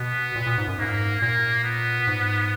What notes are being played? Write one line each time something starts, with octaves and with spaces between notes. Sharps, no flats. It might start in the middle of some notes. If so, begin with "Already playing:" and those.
Already playing: B2 B3
A#2
A#2
G#2
F#2
G#2 A#3
A#2 A#3
B3
G#2